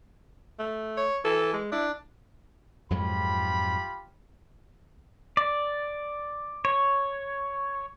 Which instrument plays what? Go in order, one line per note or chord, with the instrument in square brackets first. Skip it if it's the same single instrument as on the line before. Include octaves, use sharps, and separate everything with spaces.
[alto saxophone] A3
[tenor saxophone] C#5
[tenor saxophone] E3 [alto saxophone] A4
[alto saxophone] G#3
[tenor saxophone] D4 [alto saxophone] E4
[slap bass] F2 G#2 F#3 [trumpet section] F4 G4 B5
[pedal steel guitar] D5
C#5